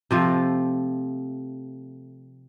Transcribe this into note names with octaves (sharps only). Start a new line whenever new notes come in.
C3 F3 A3